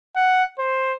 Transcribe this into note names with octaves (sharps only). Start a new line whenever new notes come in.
F#5
C5